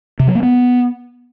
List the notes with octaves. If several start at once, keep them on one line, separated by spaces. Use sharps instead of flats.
C3
F#3
A#3
B3